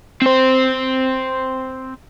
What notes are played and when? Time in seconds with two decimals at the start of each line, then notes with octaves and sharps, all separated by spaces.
0.22 C4 C5